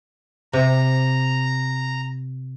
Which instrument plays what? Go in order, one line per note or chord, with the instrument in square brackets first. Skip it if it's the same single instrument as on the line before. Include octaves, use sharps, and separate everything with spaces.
[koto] C3 [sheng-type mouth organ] A#5